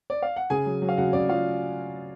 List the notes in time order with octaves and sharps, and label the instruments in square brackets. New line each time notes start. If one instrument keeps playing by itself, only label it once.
[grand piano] D5
F5
F#5
C#3 G#4 G#5
F#3
F#3
F5
C#3 F#4 F#5
C#3 D5
F#3 F4 F5